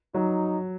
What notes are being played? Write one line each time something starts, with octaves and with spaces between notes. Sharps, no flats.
F#3 D#4